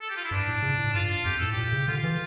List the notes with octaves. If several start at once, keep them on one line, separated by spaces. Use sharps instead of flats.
A4
G4
F4
E4
G2 D4
A2
C#3
A2
G2 F4
F2 G4
A2 A4
G4
A#2
C#3
D3 F4
E3